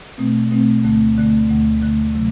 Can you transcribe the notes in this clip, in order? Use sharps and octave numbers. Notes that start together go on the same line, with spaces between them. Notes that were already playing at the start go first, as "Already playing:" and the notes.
B2 A3 C4
B2 A3 C4
D2 D3 A3
D2 D3 A3
D2 D3 A3
D2 D3 A3
C3 F#3 A3